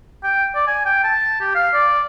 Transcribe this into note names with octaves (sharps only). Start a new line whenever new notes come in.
G5
D5
G#5
G5
A5
G4
F5
D5